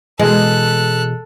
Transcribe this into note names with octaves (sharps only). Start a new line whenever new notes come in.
B2 E3 G#3 A4 F#6